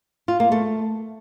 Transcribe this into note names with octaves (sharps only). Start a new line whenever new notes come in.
F4
A#3
A3